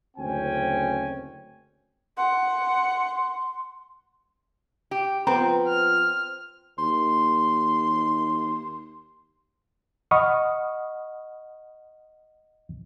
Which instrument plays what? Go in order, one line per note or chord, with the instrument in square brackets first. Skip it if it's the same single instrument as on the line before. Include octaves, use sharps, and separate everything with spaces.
[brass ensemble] F#1 D2 C4 C#4 G5 G#5
[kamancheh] F#5 [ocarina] C6
[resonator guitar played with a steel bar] G4
[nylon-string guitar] F3 B3 B4 [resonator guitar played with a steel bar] C4 [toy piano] A#5
[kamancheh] F6
[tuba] D#2 [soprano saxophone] C6
[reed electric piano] D#5 F#5 B5 C#6 D#6 F6